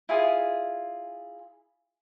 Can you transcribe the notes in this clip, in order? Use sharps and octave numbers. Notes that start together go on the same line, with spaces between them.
E4 F4 G#4 G#5